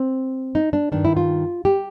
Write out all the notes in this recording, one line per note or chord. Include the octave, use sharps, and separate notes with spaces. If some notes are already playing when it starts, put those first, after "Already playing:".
Already playing: C4
D#4
D4
G2 D#3 D4
E4
F4
G4